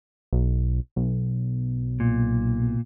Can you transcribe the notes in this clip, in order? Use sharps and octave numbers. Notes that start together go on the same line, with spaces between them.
B1
B1
A#2